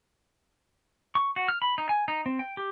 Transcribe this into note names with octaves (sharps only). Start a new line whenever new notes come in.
C#6
F#4
F6
B5
D#4
G#5
D#4
C4
G5
G4